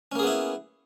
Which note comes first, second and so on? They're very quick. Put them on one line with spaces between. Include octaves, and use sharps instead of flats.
C#4 A#3 G#4 B3 E4